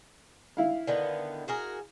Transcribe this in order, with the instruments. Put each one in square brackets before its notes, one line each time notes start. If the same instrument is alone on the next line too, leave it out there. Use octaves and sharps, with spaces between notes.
[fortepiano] E4 F5
[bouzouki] D3 D#3 B3
F#4 G#4 A#4